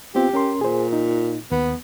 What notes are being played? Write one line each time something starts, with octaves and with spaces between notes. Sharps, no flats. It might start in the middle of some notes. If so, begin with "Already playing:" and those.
B3 C4 F4 G4
C#4 A#4 C6
A#2 G#4 C5
D#4
D#2 B3